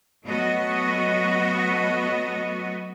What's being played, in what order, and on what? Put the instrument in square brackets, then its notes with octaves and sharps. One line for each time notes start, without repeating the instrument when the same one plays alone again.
[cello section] F#3 A3 B3 F#4 D#5